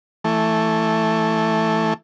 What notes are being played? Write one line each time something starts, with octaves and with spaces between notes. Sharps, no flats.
E3 A3